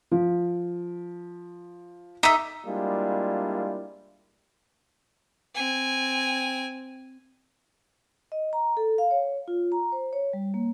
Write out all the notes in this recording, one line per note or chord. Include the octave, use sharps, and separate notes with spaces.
F3
D#4 E5 D6 B6 D#7
G3 G#3 A#3 D4 E4 F4
C4 G#5
D#5
A#5
A4
F5
C#5
F4
A#5
C5
C#5
G3
A#3